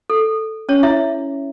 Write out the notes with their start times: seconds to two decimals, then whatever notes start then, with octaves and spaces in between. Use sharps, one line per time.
0.10 A4
0.69 C#4 C#5
0.83 E4 E5